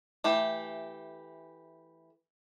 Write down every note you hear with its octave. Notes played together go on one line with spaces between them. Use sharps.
E3 A3 G4